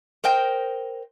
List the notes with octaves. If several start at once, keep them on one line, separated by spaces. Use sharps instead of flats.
A#4 C5 D#5 G5